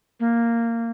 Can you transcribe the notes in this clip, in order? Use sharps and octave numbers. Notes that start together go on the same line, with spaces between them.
A#3